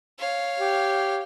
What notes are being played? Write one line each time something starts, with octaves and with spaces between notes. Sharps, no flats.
C#5 F5
G4